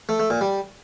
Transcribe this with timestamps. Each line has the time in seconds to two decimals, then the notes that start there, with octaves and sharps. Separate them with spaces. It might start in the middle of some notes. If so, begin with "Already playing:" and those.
0.09 A3
0.20 A3
0.30 A#2
0.41 G3